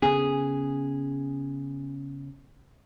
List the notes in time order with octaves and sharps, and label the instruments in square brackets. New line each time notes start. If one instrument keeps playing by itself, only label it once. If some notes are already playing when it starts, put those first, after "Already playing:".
[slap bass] C#3 B3 C#4 [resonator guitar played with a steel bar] G#4